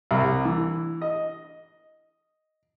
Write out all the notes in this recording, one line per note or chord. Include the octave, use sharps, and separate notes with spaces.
C2
E3
D#5